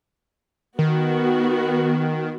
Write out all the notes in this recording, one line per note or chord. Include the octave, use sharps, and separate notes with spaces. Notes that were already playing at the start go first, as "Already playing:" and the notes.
D#3 B3 F#4